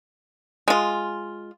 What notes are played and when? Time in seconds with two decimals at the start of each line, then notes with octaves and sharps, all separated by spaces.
0.68 G#3 F4